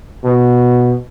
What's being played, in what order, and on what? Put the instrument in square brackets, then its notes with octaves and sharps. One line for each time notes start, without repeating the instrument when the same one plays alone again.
[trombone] B2